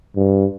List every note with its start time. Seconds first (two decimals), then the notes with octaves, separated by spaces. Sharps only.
0.16 G2